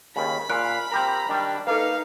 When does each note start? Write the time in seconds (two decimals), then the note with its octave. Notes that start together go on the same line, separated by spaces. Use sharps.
0.16 D#2 C#3 B5
0.49 A#2 F5 G#5 F#6 D7
0.91 C4 G4 A#4 A#5
1.29 D#3 G3 D4
1.67 A#3 D#4 A4 B4 F5